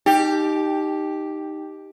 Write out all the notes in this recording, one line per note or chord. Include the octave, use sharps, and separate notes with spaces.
D#4 G4